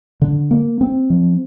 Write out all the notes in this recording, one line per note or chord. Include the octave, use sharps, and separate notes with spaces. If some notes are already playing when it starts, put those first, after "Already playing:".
D3
A#3
C4
F3